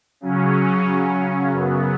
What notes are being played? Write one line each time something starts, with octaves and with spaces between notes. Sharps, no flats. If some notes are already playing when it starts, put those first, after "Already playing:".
C#3 F#3 C#4
F#2 C#3 F#3 B3